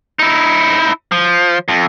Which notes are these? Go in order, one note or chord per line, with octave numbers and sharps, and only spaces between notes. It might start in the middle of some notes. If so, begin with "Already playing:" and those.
D#4 E4
F3
F2